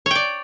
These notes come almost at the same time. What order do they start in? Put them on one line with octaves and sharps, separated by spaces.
C#5 G5 D5